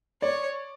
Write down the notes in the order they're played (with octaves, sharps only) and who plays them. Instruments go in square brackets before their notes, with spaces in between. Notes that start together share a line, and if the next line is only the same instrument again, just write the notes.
[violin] C#5 [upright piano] D5